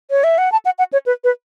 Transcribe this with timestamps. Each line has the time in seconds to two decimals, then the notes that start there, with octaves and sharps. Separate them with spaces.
0.11 C#5
0.24 E5
0.38 F#5
0.52 A5
0.65 F#5
0.79 F#5
0.93 C#5
1.06 B4
1.24 B4